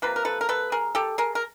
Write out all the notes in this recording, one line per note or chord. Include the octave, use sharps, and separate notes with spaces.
C3 F3 A#3 B4
A#4
A4 B4
A#4
A4 B4
G#4 A#4
G4 A4
G#4 A#4
A#4